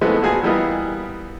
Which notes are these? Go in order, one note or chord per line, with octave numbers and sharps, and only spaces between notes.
E3 F3 G#3 A3 B3 C4
A#2 B3 F#4 G#4 G#5 A5
E3 G3 A#3 B3 D#5